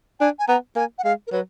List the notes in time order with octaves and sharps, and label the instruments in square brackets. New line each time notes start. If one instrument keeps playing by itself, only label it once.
[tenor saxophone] D4 [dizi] G#5
[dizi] G#5
[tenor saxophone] B3 [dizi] A#5
[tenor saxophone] A#3 [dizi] G#5
[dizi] F#5
[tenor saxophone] G#3 [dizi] F5
[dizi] A#4
[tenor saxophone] F#3 [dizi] B4